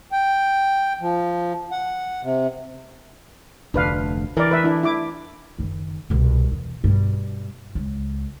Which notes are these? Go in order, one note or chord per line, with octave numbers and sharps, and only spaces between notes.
G5
F3
F#5
C3
F1 D2 D4 B4 F5
E3 A#4 D5
B4 E5
D4 E4
E4 D6
F#1 D#3
C2 B2
E2
G2 B2
C#2